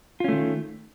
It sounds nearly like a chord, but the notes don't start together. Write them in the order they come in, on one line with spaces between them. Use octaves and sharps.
F4 C#4 A3 D#3